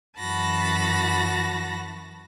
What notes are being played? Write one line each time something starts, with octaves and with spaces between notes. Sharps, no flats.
F#2 E3 F#4 A5 B5 A#6